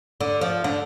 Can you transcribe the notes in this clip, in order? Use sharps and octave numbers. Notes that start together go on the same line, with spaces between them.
D3
F3
D3